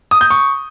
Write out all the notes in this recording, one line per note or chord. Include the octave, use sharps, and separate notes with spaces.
D#6
G6
C#6